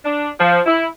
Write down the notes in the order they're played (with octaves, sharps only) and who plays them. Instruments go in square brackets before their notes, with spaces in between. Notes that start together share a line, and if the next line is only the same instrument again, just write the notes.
[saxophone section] D4
F3
E4